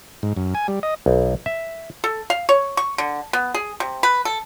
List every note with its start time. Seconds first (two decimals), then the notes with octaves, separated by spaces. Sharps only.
0.23 G#2
0.37 F#2
0.55 G#5
0.68 G3
0.83 D#5
1.06 B1
1.46 E5
2.04 A4
2.30 F5
2.49 C#5
2.77 C#6
2.98 D3
3.33 B3
3.54 G#4
3.80 C3
4.03 B4
4.25 A4